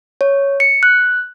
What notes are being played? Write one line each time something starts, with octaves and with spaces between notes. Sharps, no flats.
C#5
C#7
F#6